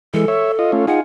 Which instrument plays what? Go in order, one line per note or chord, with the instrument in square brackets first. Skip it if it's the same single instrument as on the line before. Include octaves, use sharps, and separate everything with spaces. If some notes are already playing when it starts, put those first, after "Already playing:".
[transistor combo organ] E3 G#3 [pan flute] A4
[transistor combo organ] C#5 E5
F4 D#5
A3 C#4 F4
[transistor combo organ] D#4 F4 G#4 [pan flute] F#5